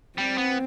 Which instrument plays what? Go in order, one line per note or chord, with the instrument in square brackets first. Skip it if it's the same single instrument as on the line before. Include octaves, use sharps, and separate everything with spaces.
[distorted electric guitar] G3 [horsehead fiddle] C4
[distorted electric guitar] B3